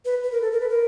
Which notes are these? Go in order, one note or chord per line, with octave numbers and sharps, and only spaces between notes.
B4
B4
A#4
A4
A#4
B4
A#4